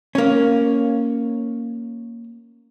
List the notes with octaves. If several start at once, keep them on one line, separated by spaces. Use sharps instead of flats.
A#3 C#4